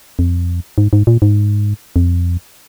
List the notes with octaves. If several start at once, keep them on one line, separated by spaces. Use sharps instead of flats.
F2
G#2
G#2
A#2
G#2
F2